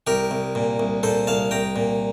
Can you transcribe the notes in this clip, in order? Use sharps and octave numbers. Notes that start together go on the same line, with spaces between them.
C2 G4 A#4
C2
A#2
C2
A#2 A4 C5
C2 F5 A5
C2 G5 A#5
A#2